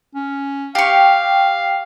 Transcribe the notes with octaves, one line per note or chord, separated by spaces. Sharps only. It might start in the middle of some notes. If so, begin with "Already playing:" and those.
C#4
G4 F5 C#6